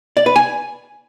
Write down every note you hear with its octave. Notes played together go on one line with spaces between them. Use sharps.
D5
B4
G#5